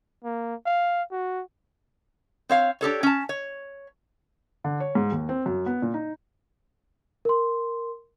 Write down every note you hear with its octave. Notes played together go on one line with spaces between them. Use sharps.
A#3
F5
F#4
C4 C#5 F5
D4 G4 A4 C#5
C#4 A5
C#5
D3
C#5
G#2
D#2
C4
F#2
B3
A#2
D#4
A#4 C6